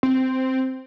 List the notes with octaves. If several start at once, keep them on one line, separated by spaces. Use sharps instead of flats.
C4